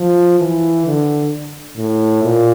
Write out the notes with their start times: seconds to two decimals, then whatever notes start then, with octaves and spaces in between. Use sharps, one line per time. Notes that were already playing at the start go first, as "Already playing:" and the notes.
Already playing: F3
0.40 E3
0.86 D3
1.77 A2
2.23 A#2